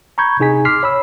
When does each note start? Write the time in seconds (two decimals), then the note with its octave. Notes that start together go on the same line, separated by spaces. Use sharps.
0.18 A#5 B5 C#6 G6 G#6
0.40 C3 D#4 G#4 G#5 B6
0.65 C6 D6 F6 B6 C7
0.83 C#5 B5 E6